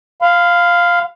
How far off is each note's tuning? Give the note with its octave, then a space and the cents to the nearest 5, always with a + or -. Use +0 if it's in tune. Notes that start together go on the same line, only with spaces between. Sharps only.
F5 +0 B5 +45